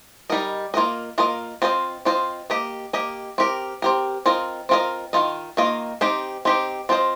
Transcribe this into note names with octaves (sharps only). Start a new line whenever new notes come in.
G3 D#4 A#4 D#5
A#3 F4 A#4 D#5
A#3 F4 A#4 D#5
C4 F4 C5 D#5
C4 F4 C5 D#5
A#3 G4 D#5
A#3 G4 D#5
C4 G4 A#4
C4 G4 A#4
C4 F4 A#4 D#5
C4 F4 A#4 D#5
D#3 A#3 F4 D#5
D#3 A#3 F4 D#5
C4 D#4 G4 C5
C4 D#4 G4 C5
C4 F4 C5 D#5